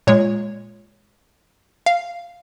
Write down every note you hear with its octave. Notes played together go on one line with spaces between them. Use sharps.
A#2 G#3 C#5
F5